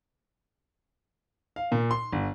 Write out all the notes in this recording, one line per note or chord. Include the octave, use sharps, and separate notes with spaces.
F5
A#2
C6
G1